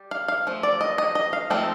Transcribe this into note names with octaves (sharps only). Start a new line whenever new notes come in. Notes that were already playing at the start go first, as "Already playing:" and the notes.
Already playing: G3
F5
F5
F3 A3
D5
D#5
D#5
D#5
F5
F3 A3 C4 D#4